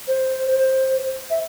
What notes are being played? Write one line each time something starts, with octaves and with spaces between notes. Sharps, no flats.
C5
C5
E5